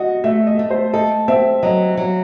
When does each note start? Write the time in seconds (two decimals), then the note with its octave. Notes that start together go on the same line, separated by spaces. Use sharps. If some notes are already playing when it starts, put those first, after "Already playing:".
Already playing: F#4 D#5
0.24 A3 E5
0.47 D#5
0.59 A3
0.70 C5
0.93 A4 D#5
1.28 C4 E5
1.63 F#3 D#5
1.97 F#3